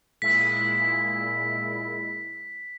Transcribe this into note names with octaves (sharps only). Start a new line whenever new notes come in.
A#2 G#3 E4 B6